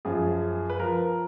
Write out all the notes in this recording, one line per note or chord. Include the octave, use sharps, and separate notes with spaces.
F#2 F3 G#4
B4
F3 A#4